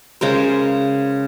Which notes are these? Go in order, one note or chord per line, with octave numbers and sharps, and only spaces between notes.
C#3 G#3 A#4 C5